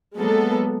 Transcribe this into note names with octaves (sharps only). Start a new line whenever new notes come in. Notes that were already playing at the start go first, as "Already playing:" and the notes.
F#3 G#3 A#3 B3 A4